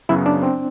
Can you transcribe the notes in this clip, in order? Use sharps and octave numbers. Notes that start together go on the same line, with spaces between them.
F#2 C#3 F#3 B3 E4
D4
C4